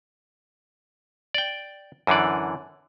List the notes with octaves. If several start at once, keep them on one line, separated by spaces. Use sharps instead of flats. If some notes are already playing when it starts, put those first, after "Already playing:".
D5 G5
F#2 D3 E3 D5